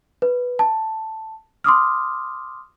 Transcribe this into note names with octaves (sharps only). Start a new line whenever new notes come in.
B4
A5
C6 D6 D#6 F6